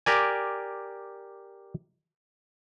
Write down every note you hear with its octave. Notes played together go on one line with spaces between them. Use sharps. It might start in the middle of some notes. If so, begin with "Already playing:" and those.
G4 A#4 D5 G#5